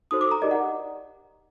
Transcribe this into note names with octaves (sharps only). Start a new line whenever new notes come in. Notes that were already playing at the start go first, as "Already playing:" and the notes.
D#4 F#4 A4 C5 D#6
D6
A#5
D#4 G4 A#4 D5 D#5
F#5